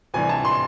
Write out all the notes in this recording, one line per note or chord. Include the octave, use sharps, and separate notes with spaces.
D2 C3 E3 G3 G#5
A5
C6